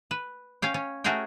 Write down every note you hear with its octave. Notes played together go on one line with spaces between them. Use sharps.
B4
C#4 F5 G5
C#4
A3 C#4 F#4 G#4 A#4 G5